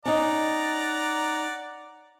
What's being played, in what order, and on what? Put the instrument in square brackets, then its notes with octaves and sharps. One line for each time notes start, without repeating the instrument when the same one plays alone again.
[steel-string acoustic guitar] C#4 D#4 [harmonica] D5 F#5 A#5